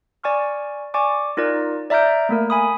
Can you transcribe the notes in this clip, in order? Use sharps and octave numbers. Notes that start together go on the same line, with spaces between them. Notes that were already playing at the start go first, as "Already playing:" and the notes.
D5 G#5 C#6 F6
D5 G#5 C#6 D6
D#4 F4 A#4 D5
D5 E5 A#5 F6 G6 D7
A3 A#3 A#4
G#5 B5 D#6